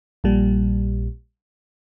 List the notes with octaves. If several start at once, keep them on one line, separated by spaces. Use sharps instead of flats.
A#1 A#2 G3